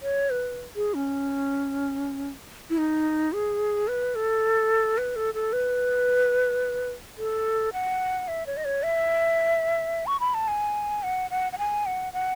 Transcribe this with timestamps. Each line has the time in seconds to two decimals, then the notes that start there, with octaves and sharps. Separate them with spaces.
0.02 C#5
0.30 B4
0.76 G#4
0.94 C#4
2.70 E4
2.78 D#4
3.33 G#4
3.88 B4
4.15 A4
4.98 B4
5.16 A4
5.34 A4
5.53 B4
7.18 A4
7.73 F#5
8.28 E5
8.47 C#5
8.57 D#5
8.65 C#5
8.83 E5
10.07 C#6
10.20 B5
10.34 A5
10.48 G#5
11.03 F#5
11.31 F#5
11.52 F#5
11.58 G#5
11.86 F#5
12.13 F#5